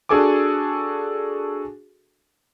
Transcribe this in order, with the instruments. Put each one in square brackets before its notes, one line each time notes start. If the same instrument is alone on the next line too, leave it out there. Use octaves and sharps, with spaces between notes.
[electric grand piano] D4 F#4 G#4 A4 G#5 D6